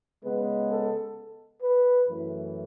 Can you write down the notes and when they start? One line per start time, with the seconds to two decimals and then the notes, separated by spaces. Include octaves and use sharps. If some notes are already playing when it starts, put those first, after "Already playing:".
0.23 C#3 G#3 B3 B4
0.70 A4
1.61 B4
2.07 F#2 E3 A3